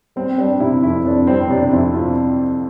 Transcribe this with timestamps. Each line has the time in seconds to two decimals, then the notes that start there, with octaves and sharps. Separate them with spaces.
0.16 G3 C4
0.38 G3 D4
0.60 C3 E4
0.83 F2 E4
1.06 F2 D4
1.27 G3 C4
1.41 C4
1.50 C3 D4
1.72 F2 E4
1.94 C3 F4